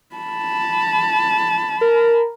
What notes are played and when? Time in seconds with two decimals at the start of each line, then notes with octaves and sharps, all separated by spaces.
0.16 A5 B5
1.81 A#4